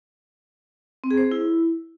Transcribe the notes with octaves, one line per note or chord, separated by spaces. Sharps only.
C4
G#4
C5
G#4
E4